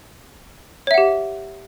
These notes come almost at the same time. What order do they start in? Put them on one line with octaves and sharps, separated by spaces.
C#5 E5 F#5 G4